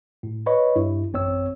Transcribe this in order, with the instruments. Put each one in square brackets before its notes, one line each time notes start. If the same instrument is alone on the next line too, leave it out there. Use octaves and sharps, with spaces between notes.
[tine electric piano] A2
B4 C#5 D#5 B5 C#6
G2 E4
A1 F#2 C4 C#5 E6